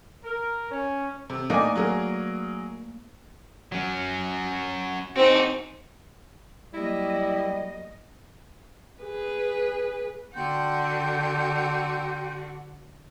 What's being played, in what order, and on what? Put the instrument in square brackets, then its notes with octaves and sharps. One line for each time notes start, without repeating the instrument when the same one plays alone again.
[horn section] A#4
C#4
[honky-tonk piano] C3
[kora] A3 A#3 D4 [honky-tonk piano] D#4 G#5
[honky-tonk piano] F#3 G#4 A#4
[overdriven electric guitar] F#3 C#4
[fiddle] C4 D#4 [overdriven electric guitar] F#4 G#4
[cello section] F#3 A#3 D#5 [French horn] G3 [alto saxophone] E4
[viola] G#4 B4
[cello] D3 F#4 [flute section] G5 C6 G6